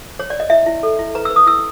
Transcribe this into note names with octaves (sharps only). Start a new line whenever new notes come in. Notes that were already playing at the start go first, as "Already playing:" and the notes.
C#5
D5
D#5
E4 E5
E4
A4
E4
B4 A#5
E6
B4
D#6
E4 E6